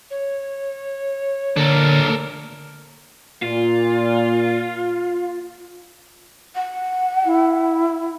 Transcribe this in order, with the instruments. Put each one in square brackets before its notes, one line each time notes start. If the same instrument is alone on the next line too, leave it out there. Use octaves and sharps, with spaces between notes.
[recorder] C#5
[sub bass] D3 [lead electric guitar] A#3 D4 [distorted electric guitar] A4 A#4
[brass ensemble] A#2 [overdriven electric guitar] F4
[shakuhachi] F#5
[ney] E4